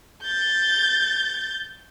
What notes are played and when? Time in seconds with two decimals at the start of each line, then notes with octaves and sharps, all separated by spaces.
0.25 G6 A6